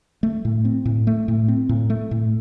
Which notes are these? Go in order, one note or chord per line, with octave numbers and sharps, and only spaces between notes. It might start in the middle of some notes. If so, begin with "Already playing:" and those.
A3
A2
C4
A2
A3
A2
C4
A2
A3
A2